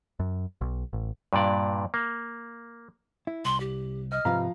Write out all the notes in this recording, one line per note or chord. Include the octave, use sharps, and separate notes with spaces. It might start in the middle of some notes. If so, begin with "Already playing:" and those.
F#2
B1
A1
G2 A#2 D5
A#3
E4
C2 C6 F#7
G4
D#5 F6
G#2 C3 F3 B4 F5 A#5